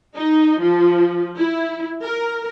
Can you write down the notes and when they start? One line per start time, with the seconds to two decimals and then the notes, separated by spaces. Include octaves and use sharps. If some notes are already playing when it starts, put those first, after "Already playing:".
0.16 D#4
0.61 F3
1.37 E4
2.03 A#4